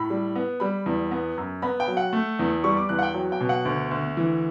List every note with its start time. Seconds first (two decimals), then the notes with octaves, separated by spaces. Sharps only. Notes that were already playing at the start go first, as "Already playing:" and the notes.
Already playing: A2 B5
0.10 G3
0.36 B3
0.60 G3 B5
0.86 E2
1.11 B3
1.37 F#2
1.62 B3 B5
1.80 G5
1.88 F#3
1.97 F#5
2.13 A3
2.39 E2
2.64 G3 C#6
2.77 D6
2.89 E2 F#6
2.99 F#5
3.03 G5
3.14 F#3
3.32 G5
3.41 B2
3.49 F#5
3.65 D2
3.91 D2
4.17 E3